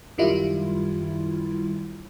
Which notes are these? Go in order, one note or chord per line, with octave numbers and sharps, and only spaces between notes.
F#2 D#3 G3 E4 F4